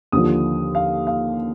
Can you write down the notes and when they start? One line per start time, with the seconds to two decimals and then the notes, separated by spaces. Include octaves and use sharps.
0.12 D#2 D3 F3 D#6
0.75 F5
1.07 F5